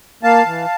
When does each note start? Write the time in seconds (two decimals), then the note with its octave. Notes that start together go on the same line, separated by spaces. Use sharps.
0.23 A#3 F5 A5
0.46 E3